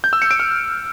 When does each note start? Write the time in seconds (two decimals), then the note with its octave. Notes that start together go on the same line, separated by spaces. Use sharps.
0.04 G6
0.13 E6
0.22 C#7
0.31 D7
0.40 F6